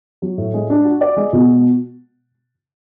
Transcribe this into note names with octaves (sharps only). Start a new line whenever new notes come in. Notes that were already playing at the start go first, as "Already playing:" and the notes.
F#3
A2
G#3
D4
F#4
D5
G#3
B2